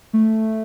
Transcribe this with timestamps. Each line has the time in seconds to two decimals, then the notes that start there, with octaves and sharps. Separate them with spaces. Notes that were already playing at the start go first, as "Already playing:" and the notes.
0.13 A3